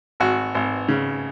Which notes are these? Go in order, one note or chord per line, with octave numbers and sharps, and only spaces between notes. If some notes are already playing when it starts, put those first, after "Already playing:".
G#1 F#4
G#1
C#3